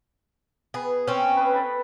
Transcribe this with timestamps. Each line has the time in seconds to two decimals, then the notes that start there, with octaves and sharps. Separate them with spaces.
0.74 B3 G#4
1.07 C4 C#4
1.37 B4 D#6
1.53 A4 G5 B5